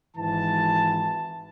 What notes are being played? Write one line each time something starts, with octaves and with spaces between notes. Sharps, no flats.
G#1 G#2 E3 A5